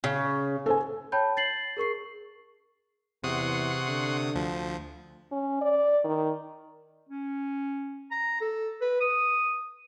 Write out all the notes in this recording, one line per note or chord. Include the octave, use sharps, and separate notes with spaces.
C#3
A4 C5 G#5
C#5 G5 A5 B5 G6
A6 C7 F#7
G#4 A#4 C#6 C7
E2 C3 F#5 C6 C#6 D#6
D3
D2 F3
C#4
D5
D#3
C#4
A#5
A4
B4
D#6